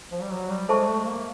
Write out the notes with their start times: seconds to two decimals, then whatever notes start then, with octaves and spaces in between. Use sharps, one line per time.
0.11 F3
0.22 G3
0.31 F#3
0.50 G3
0.69 G#3 A4 C5 E5 A5 C#6
0.88 A3
1.07 A#3